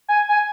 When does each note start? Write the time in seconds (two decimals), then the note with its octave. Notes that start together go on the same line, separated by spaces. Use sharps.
0.09 G#5
0.29 G#5